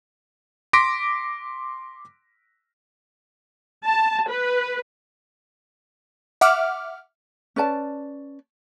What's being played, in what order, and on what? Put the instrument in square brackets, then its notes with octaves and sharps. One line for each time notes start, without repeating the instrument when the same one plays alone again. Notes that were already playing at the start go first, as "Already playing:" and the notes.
[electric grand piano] C6 D6 A#6 B6 D7
[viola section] A5
B4
[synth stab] E5 F#5 D6 F6
[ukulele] C#4 B4 D5 A5